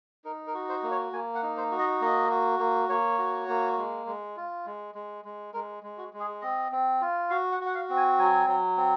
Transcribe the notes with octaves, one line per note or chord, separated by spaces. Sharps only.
D#4 A#4
A#4
F#4
C5
A#3
C#5
A#3 G#5
F#5
D#4
C5
F#4
D#5
A#3 D#5
F#4
A#3
A#3 C#5
F#4
A#3
G#3
G#3
F4
G#3
G#3
G#3
G#3 A#4
G#3
F#4
G#3
G#4
C4 D#5
C4
F4
F#4 F5
F#5
F#4
F#5
F5
C4
G#5
F#3 G#5
F#3
C4